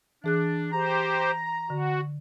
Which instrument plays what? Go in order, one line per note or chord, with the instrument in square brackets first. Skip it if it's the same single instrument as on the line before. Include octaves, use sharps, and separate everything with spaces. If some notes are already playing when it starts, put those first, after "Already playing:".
[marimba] E3 G#4 F#6 [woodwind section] D4
[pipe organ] G4 C5 [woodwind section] A#5
[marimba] D3 [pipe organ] F#4